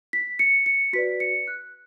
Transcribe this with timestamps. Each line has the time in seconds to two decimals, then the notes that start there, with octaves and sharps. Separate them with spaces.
0.13 B6
0.39 C#7
0.66 C#7
0.93 F#4 B4 D5 B6
1.20 C#7
1.47 F#6